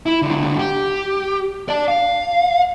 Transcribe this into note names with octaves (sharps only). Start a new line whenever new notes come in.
E4
C#2 D3
G4
D5 A5
F5